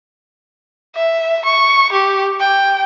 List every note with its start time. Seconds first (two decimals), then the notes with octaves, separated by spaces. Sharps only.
0.95 E5
1.45 C#6
1.92 G4
2.40 G5